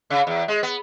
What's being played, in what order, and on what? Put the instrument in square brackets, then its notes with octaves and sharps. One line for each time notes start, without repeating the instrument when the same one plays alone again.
[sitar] C#3
E2
G#3
B3